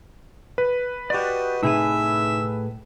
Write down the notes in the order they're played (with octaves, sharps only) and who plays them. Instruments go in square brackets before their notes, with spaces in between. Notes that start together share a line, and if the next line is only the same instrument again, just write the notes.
[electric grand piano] B4
[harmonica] F#4 D#5 [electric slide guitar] G4 D5
[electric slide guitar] A2 G#4 G#5 [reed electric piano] C3 D#4 [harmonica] E5 E6